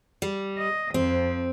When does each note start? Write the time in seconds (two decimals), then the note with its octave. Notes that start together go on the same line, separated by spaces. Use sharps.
0.22 G3
0.57 D#5
0.94 F2 C4